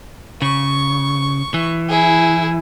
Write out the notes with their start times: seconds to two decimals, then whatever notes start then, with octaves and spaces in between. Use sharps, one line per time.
0.42 C#3 C#6
1.54 E3
1.89 E4 G#4